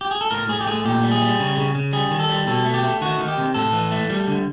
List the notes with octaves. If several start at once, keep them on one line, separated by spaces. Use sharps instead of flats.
G4
G#4
A4
A2 A#4
A2 G#4
G4
A3 G#4
A#2 G4
G3
G#4
G3
C#3
C#3
C#3
G3 G#4
D#3
A4
G3
B2 A4
A3
G4
A3
D#3 F#4
D#3
G4
C3
A2 A4
E3
A3
G3
D3